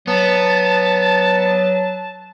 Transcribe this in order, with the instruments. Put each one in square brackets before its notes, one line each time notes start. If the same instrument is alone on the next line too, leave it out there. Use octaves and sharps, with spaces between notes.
[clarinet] F#3 [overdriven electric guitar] B3 [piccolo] A5